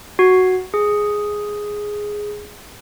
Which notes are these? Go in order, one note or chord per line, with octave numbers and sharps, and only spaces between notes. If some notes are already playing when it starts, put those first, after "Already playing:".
F#4
G#4